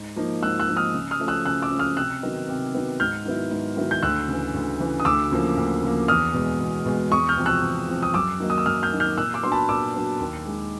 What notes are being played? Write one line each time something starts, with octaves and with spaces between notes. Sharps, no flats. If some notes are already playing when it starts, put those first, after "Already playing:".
Already playing: G#2
F3 A#3 D#4
G#2 E6 F#6
E6 F#6
F3 A#3 D#4
D#6 F6
C#3
D#6 F6
F3 A3 C#4
E6 F#6
C#3 E6 F#6
D6 E6
F3 A3 C#4
D#6 F6
C3 E6 F#6
D#3 F#3 B3 D#4
C3
D#3 F#3 B3 D#4
G#2 F6 G6
D#3 F#3 B3 E4
G#2
D#3 F#3 B3 E4
G6
D2 E6 F#6
C#3 E3
D2
C#3 E3
D#6
D2 D6 E6
C#3 F3 A#3
D2
C#3 F3 A#3
E2 D#6 F6
B2 G#3
E2
B2 G#3
E2 C#6 D#6
F6 G6
C3 F3
E6 F#6
E2
C3 F3
D#6
F#2 D6 E6
D#3 F#3 A#3 D#4
D#6
E6
F#2 D#6 F6
F6 G6
D#3 F#3 A#3 D#4
F6 G6
A#2 E6 F#6
D6 E6
F#3 B3 D4 C6
A5 B5
A#2 D6 E6
F#3 B3 D4
D#2
D#3 G#3